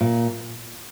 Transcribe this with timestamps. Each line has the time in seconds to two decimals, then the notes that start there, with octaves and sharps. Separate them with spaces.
0.01 A#2